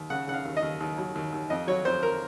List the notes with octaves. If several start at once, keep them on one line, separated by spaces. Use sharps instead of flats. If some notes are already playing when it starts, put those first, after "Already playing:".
Already playing: D#2
C#3 F#5
C#3 F#5
F5
D#2
D#5
D#2
D#2
F#3
D#2
D#2
F2 D#5
F#3 C#5
F2 C5
A#4